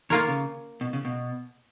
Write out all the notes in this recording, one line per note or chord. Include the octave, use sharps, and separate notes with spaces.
D#3 A#3 F4 A#4 C#5
C#3
B2
C#3
B2